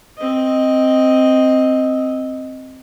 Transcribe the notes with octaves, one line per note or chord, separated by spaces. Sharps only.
C4 D#5